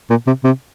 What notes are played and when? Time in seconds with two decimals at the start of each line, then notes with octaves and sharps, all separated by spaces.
0.10 A#2
0.27 C3
0.44 C3